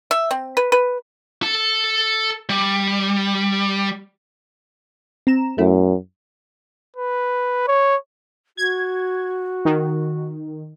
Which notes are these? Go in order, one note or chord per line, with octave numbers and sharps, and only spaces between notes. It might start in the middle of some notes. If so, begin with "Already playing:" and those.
E5
C4
B4
B4
A4 A5
G3
C4 A#5 E7
F#2 A3 E4
B4
C#5
F#4 G#6
D#3